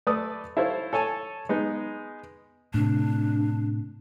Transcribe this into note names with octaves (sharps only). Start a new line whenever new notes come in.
A3 B4 D5 D#6
E4 A4 C5 C#5 F5
A4 C#5 G#5 A5
G#3 B3 D#4
A2 C3 D4